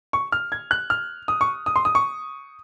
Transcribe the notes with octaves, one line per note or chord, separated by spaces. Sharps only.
C#6
F6
G#6
F#6
F6
D#6
C#6
D#6
C6
D#6
C#6